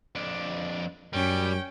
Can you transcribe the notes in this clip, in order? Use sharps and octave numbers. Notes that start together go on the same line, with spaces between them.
F2 D4
F#2 G3 C#4 G5